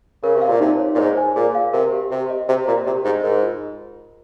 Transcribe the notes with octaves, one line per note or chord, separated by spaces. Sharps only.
C#3 A#4
C3
F5
A#2
C3 D#4
C#5
A#2
G#2 C5
G#5
A#2 G#4
F5
C3 A#4
G4
C3 G4
D#5
C3 C5
A#2 A#5
C3 G4
G#2 D#5
G#2 A#4
F4